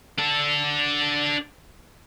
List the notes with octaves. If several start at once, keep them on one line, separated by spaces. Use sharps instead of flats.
D4 A4